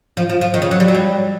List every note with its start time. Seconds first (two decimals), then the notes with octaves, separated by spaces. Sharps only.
0.17 F3
0.29 F3
0.41 F3
0.54 D#3
0.62 C#3
0.71 F#3
0.80 G3
0.88 F#3
0.95 G3